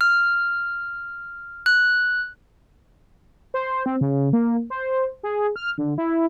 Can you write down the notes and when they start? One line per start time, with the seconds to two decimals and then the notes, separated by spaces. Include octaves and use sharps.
0.01 F6
1.66 F#6
3.54 C5
3.86 C4
4.01 C#3
4.33 A#3
4.70 C5
5.23 G#4
5.56 F6
5.78 D3
5.98 E4